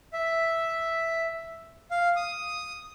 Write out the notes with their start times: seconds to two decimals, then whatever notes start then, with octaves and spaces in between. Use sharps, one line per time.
0.13 E5
1.91 F5
2.16 D#6